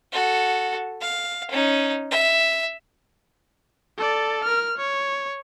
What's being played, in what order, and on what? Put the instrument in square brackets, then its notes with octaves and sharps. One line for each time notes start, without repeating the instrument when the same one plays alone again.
[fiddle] F#4 A4
F5
C#4 D#4
E5
[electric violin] A4 D5
A#4 F6
C#5